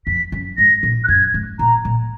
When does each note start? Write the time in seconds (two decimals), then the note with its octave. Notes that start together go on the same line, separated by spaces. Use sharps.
0.06 F2 B6
0.32 F#2
0.58 G#2 A#6
0.83 A#2
1.04 F#6
1.08 F#2 G#6
1.34 G#2
1.59 A#2 A#5
1.85 A#2